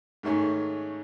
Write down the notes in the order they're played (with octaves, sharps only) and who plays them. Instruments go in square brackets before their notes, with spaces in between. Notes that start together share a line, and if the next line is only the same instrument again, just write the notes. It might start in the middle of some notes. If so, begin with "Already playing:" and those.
[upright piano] G#2 D#3 A3 C#4 G#4